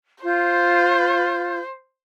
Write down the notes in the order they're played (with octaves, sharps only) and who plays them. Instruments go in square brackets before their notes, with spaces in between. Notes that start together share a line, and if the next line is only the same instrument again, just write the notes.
[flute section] F4 G6 [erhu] C5